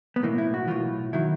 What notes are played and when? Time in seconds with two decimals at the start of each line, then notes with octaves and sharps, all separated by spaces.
0.16 B3
0.22 B1 A2 E3 A#3
0.38 E4
0.54 F#4
0.67 B1 A2 E3 F4
1.13 D#3 F#3 E4